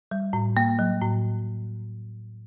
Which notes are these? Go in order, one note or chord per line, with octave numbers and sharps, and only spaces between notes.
G3
A2
A#3
F#3
A2